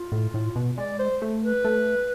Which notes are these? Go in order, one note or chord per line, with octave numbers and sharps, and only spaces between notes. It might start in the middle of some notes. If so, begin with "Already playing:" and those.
Already playing: F4
A2
A2
B2
G#3 D5
C5
A3
B4
A3